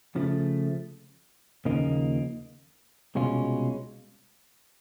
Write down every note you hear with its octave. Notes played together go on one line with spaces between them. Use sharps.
C#3 F3 A3
D#2 C#3 F3 A#3 D#4
C2 B2 G#3 C#4 F4